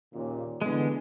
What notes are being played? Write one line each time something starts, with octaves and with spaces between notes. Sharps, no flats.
D#2 A#2 C#3
D3 E3 G#3 B3